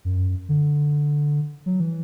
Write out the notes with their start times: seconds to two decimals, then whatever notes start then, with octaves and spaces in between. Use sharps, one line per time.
0.05 F#2
0.49 D3
1.66 F#3
1.80 E3